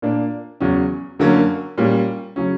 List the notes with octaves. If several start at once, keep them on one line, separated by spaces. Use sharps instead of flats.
A#2 A#3 D4
E2 C#3 F#3 C#4
F#2 D3 F#3 A#3 C#4
A#2 G3 C#4
C#3 F#3 C#4